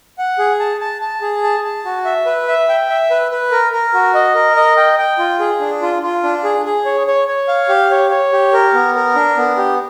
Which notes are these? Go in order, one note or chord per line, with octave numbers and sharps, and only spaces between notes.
F#5
G#4
A5
A5
A5
G#4
A5
A5
F#4
E5
B4
E5
G5
E5
B4
B4
A#4
A#4
F#4
D#5
A#4
D#5
G5
G5
F4
G#4
D4
F4
F4
D4
G#4
G#4
C#5
C#5
C#5
F5
G4
C#5
C#5
G4
A#4
B3
A#4
D4
B3
G4